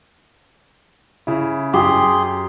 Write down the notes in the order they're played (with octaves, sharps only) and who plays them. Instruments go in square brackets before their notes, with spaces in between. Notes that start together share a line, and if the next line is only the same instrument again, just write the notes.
[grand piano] C#3 E4
[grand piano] F#2 [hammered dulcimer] G4 [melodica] G#4 C6